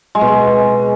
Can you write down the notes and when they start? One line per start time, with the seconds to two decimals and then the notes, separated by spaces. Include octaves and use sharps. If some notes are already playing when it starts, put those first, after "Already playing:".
0.15 G#3
0.21 B2
0.27 G#3